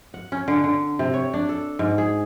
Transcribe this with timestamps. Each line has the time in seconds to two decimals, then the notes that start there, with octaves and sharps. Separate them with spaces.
0.14 F#5
0.32 C#4
0.48 D3
0.64 D3
0.99 C3
1.14 C#5
1.34 D4
1.49 A4
1.79 G#2
1.98 G#4